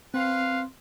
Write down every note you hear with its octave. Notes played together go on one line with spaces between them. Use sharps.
C4 B4 C5 F5